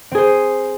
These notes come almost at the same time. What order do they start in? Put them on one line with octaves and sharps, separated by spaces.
C4 G#4 C5